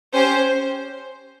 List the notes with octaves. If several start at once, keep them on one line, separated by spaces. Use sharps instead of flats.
C#4 G4 C5